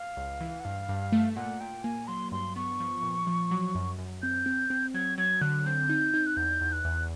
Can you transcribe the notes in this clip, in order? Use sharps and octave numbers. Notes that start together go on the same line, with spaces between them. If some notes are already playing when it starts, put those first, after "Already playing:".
Already playing: F5
C#2
E3
F#5
G2 F5
G2
A3
A#2 F#5
A#2 G5
A#3 G#5
F#3 C6
G2 C6
B3 C#6
F3
A#2
F3
F#3
F#2
F#2
C4 G6
C4
C4
F#3 G#6
F#3 G#6
D3 F#6
C4 G6
D#4
D#4
F#6
E2 G6
E2
F#6
E2